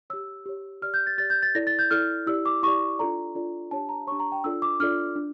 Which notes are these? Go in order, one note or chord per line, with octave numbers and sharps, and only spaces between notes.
G4 C#5 E6
G4 C#5
G4 D5 F6
G6
A6
G4 D5 A6
G6
A6
E4 A4 D5 A#6
A6
G6
E4 A4 D5 F6
E4 G4 D5 E6
D6
E4 G4 D5 C#6
D4 F4 A4 D5 A#5
D4 F4 A4 D5
D4 G4 C#5 A5
A#5
D4 G4 C#5 C#6
A#5
G5
D4 F4 A4 D5 E6
D6
D4 F4 A4 D5 F6
D4